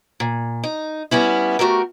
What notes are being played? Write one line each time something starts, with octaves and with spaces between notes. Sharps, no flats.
A#2
D#4
G3 B3 C#4 E4
A3 F#4 G4 A#4